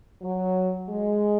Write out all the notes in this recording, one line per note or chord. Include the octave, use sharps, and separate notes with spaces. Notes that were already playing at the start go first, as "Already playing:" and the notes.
F#3
G#3